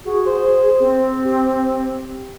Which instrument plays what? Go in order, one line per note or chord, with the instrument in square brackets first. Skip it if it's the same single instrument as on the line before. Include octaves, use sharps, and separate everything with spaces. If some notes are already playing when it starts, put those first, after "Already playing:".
[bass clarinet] F#4 [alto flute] G#4
[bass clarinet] C5
[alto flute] C4
[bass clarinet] G4